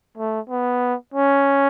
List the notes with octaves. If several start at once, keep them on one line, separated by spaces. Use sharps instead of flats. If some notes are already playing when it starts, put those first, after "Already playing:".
A3
B3
C#4